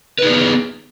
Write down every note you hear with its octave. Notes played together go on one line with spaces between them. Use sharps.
B3 D#4 G#4 B4